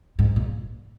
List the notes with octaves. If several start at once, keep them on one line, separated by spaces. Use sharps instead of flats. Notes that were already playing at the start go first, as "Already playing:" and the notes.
G#2
A#2